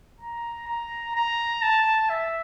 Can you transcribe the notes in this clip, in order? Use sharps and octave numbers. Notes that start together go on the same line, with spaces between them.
A#5
A#5
A#5
A5
E5